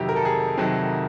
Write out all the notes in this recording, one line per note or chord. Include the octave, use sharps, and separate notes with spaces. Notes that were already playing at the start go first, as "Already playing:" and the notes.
Already playing: F2 C3 D#3 F#3 G4
A#4
A4
G#4
C3 D#3 F#3